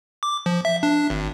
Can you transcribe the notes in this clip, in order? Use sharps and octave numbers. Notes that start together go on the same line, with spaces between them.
D6
F3
E5
D4
G#1